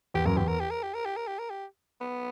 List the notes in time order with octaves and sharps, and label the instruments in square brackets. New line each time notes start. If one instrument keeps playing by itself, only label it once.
[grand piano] E2 [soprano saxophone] G4
[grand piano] F#2 [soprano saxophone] A#4
[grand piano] E2 [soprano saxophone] G4
[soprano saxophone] A#4
G4
A#4
G4
A#4
G4
A#4
G4
A#4
G4
B3